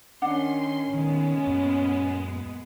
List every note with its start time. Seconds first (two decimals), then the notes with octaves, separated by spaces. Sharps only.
0.22 D#3 C#4 D4 F#5 C6
0.94 A#2 D#3 G#3 B3
1.47 F#2